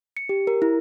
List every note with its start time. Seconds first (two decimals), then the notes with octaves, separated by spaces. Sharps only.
0.17 C#7
0.29 G4
0.47 A#4
0.62 E4